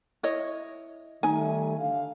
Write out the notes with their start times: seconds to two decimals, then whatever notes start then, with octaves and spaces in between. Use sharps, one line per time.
0.23 E4 C#5 D#5
1.23 D#3 G3 A3 D#4 G#5
1.78 D3 F5